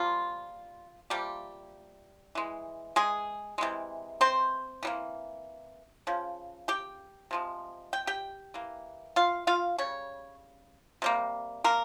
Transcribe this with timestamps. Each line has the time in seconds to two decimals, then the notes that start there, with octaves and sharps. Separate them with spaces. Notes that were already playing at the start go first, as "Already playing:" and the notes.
Already playing: F3 G3 A#3 F4
1.10 C3 F3 G3 A#3 G4
2.35 E3 G#3
2.96 G#3 G#4
3.58 C3 E3 G#3
4.21 C4 C5
4.83 E3 G3 A#3
6.07 C#3 F3
6.68 G4 G5
7.31 C3 F3 G#3
7.93 G5
8.07 G4 G5
8.54 E3 A#3
9.16 F4 F5
9.47 F4 F5
9.78 C#3 G3 C#5
11.02 C3 G3 A#3
11.64 A#3 A#4